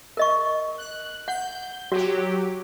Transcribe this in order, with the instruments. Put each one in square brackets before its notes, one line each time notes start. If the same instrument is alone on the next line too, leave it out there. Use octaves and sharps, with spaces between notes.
[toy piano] A#4 D#5 C#6
[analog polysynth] F#6
[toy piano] F#5 [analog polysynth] G6
[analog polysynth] F#3 G4 [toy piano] F#4